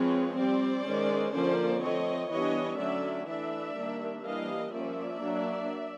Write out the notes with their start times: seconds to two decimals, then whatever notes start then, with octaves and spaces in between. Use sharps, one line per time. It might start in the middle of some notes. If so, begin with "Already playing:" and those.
Already playing: F3 G#3 C4 B4 C#5
0.37 G3 C4 C5 D5
0.86 D#3 G#3 C#4
1.33 D3 F3 A#3 C#4 C5 D5
1.82 F3 A3 C4 C#5 D#5
2.30 E3 G3 B3 D4 C#5 D#5
2.78 D3 F#3 A3 C#4 D5 E5
3.27 E3 A3 D4 D5 E5
3.75 D#3 G3 A#3 D4
4.23 E3 G3 A#3 D4 D#5 F5
4.72 F3 A#3 C#4 D5 E5
5.20 F#3 A#3 D4